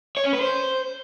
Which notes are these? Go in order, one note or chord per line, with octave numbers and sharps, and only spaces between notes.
C#5
C#4
B4
C5